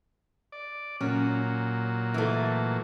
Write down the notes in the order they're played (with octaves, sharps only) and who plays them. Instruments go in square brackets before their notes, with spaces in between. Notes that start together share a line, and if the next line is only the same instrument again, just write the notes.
[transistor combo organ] D5
[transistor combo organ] A#2 F#3 [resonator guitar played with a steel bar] C#4
[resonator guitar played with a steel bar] E3 A3